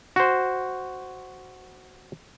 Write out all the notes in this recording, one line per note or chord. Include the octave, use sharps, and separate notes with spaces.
F#4 C5